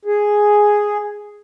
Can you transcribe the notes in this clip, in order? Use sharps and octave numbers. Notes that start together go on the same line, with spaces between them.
G#4